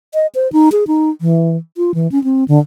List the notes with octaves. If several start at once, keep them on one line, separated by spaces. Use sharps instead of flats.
D#5
C5
D#4
G#4
D#4
E3
F4
E3
C#4
C4
D3